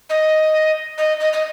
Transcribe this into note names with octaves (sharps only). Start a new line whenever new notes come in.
D#5
D#5
D#5
D#5